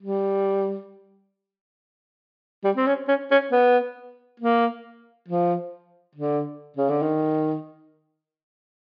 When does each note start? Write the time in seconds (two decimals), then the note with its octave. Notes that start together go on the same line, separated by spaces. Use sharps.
0.02 G3
2.64 G3
2.76 C4
2.87 C#4
3.08 C#4
3.31 C#4
3.52 B3
4.40 A#3
5.28 F3
6.15 D3
6.76 C#3
6.89 D3
7.02 D#3